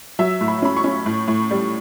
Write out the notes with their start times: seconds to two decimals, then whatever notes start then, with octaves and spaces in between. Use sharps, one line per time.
0.19 F#3 E5
0.41 A2
0.48 B5
0.62 C#4 B5
0.77 C#6
0.84 C#4
1.06 A2
1.28 A2
1.51 G3